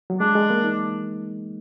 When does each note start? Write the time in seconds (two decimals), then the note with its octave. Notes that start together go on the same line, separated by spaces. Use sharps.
0.10 F#3
0.20 G#3 D4
0.35 G#3
0.50 A#3
0.64 D#4